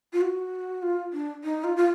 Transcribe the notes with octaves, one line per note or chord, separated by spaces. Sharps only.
F4
F#4
F4
D4
D#4
F4
F4